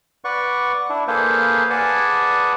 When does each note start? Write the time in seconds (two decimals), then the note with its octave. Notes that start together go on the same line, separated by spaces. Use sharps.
0.24 B4 D5 F#5 C#6
0.89 D4 E4
1.08 A#3 G#4 A4 B4 C5 F5
1.70 G#4 B4 D5 F#5 G#5 A5